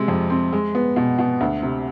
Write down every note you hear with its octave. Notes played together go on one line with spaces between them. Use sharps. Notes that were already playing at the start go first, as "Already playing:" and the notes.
Already playing: C3 G#3
F2
C4
G#3
B3
B2
B2
D2
C3